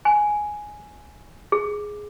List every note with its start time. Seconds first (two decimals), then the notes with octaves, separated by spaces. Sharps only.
0.05 G#5
1.52 G#4